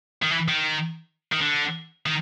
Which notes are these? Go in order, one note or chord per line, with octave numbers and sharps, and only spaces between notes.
D#3
E3
D#3
D#3
D3
D#3